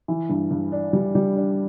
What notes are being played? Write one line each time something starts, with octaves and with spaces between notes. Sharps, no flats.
E3
G2
G2
D4
G3
G3
D4